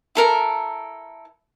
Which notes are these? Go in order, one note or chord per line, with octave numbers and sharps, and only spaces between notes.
E4 A4 A#4